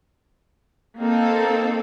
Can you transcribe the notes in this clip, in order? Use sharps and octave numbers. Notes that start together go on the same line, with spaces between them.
A#3 C4 D#4 A4